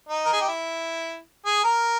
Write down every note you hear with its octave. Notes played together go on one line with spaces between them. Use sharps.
D#4
A#4
G#4
G4
E4
G#4
A#4